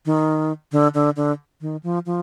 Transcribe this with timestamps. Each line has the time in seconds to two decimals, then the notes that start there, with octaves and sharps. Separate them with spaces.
0.06 D#3
0.72 D3
0.94 D3
1.16 D3
1.61 D#3
1.83 F3
2.06 F3